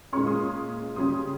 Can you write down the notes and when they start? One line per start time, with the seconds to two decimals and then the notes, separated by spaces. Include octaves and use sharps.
0.13 A#2 G#3 C#4 C#6 F6
0.27 C6 D#6
0.96 C#3 G3 C#4 C6 D#6